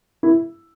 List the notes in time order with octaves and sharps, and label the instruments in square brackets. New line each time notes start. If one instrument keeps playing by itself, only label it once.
[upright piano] E4